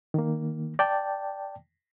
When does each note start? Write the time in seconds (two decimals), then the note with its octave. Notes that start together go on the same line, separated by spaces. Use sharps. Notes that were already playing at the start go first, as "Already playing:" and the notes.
0.14 D#3 A#3
0.79 D5 G5 A5